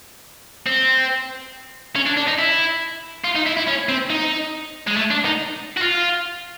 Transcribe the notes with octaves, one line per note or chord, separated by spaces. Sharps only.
C4
C#4
D4
D4
D#4
E4
F4
D#4
E4
E4
C#4
C4
D#4
G#3
A3
D4
D#4
F#4
F4